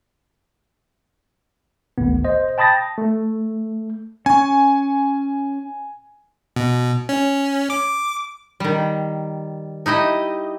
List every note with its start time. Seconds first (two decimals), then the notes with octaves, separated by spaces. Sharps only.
1.98 G#1 D2 B3
2.24 C5 D#5
2.58 G5 A5 B5 D#6 A6 A#6
2.98 A3
4.26 C#4 G#5 C#6
6.56 B2
7.09 C#4
7.70 D6
8.60 D#3 G3
9.86 D#4 E4 G4 D#5